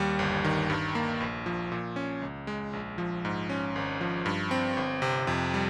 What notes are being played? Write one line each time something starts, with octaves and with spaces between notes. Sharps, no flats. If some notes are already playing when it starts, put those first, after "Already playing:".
Already playing: D#2 G3
G1
D#3
G2
A#3
A#1
F3
A#2
C#4
C#2
G#3
A#1
F3
G#2
C#4
G#1
F3
G2
C4
G1
C3
F2
G3